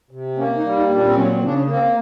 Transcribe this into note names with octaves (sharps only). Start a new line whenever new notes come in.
C3
A#3 C#4
D#4
G3
D#4
A#2
D4
C4
F#3 C#4
C4
C#3 D4
C#4
A#3
C4